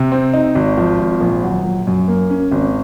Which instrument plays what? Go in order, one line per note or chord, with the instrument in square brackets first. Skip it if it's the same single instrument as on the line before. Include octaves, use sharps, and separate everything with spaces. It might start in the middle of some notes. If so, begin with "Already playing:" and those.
Already playing: [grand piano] C3
C4
D#4
G#1
F3
G#1
A#1
F#3
A#1
F#2
A#3
C#4
G#1